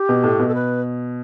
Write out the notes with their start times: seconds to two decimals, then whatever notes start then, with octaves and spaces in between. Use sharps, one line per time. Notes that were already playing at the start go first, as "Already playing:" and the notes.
Already playing: G4
0.09 B2
0.23 A2
0.39 B2
0.48 A4
0.54 B4